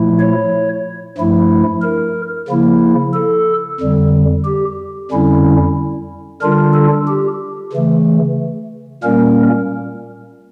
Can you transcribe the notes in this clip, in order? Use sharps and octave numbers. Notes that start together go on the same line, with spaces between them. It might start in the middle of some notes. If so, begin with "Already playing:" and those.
Already playing: A#2 F3 A3 E4
C#5
G2 F3 A3 E4
A#4
C#3 F3 A#3 E4
A4
F2 D3 G3
G4
F2 D3 G3 C#4 E4
D3 G3 D4 F4 A#4
A4
G4
C#3 E3 A3
A#2 G3 A#3 C#4 A#4